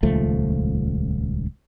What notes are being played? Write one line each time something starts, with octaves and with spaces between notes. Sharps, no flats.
D#1 C#2 F3 A3